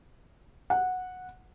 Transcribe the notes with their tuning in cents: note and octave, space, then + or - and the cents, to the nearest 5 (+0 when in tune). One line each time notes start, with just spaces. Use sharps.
F#5 -10